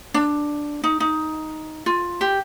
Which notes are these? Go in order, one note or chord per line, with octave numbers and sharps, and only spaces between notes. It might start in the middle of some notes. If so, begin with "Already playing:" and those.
D4
D#4
D#4
F4
G4